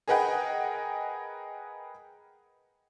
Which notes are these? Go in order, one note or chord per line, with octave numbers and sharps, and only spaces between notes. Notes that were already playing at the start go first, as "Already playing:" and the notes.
G#4 A#4 B4 D#5 F#5 G5